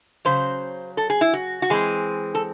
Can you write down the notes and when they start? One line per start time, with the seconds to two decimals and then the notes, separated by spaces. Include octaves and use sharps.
0.25 C#3 F#3 C#4 C5
0.97 A4
1.10 G#4
1.21 E4
1.33 F#4
1.62 F#4
1.70 E3 G#3 C4 G#4
2.35 A4